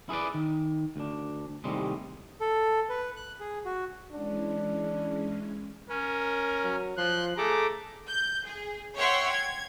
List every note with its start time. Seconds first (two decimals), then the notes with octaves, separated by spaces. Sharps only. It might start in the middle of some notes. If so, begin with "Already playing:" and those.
0.09 E4 G#4 A4 B4 D5
0.34 D#3
0.96 D2 D4
1.64 D#2 A2 C3 G3 G#3
2.40 A4
2.89 B4
3.16 F#6
3.40 G#4
3.65 F#4
4.12 E3 G#3 C#4 D4
5.89 C#4 A#4
6.64 F#3
6.98 F3 C6 F#6
7.37 A3 G#4 A4 A#5 D6
8.08 G6
8.46 G#4
8.95 C#5 E5 F#5 G5 C6 C#6
9.31 G#6